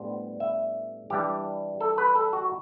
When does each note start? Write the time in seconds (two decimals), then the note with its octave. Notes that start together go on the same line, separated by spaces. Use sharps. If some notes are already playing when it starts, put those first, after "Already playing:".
Already playing: A2 G3 B3 D4 C5
0.40 E5
1.10 E3 G3 D4 G4
1.81 A4
1.98 B4
2.15 A4
2.33 F#4